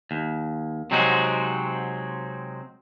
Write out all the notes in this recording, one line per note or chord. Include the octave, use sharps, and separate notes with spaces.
D#2
C3 F#3 G#3 C4 D#4 F#4